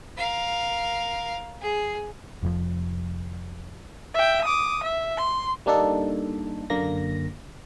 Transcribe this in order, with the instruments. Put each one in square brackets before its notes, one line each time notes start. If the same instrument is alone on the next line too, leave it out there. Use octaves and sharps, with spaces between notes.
[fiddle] A#4 F5
G#4
[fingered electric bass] F1 F2 G#2 F3
[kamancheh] E5 G5
D6 D#6
E5
C6
[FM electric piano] G3 A#3 D4 D#4 A4
F#2 D3 A#3 A#6